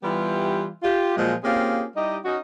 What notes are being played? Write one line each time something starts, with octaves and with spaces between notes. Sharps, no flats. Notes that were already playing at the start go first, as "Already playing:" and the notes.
E3 G3 B3 E4 F4 G4
F4 G4
A#2 F3 F#3 G#3
A#3 C4 C#4 F4 G4 G#4
G3 D#4 E4 G4 D#5
C#4 D#4 F#4